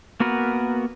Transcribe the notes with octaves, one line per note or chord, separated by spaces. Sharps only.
A#3 B3 F#4 A#4 B4